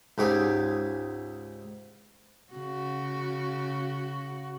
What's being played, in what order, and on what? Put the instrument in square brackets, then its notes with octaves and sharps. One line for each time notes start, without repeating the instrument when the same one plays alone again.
[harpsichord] C#2 G#2 G4 G#4
[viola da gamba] C#3 F#4